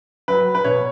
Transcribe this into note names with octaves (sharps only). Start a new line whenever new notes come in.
F#3 B4
B4
B2 C#5